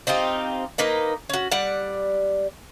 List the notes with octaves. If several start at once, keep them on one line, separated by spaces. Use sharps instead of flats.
C4 D#4 F4 G4
A#3 D#4 B4 D#5
C#4 F#4
G3 D5 F#5